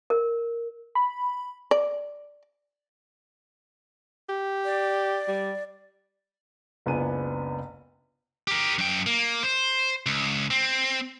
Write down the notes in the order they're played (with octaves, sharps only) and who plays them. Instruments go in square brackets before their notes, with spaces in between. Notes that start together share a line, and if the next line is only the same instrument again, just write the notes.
[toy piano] A#4
[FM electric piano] B5
[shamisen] D5
[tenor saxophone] G4
[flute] D5
[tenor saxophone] G3
[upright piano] F#1 C#2 B3 D4 G#5 D#7
[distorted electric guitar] G4 A#4
F#2 G5
A#3
C5
C#2
C4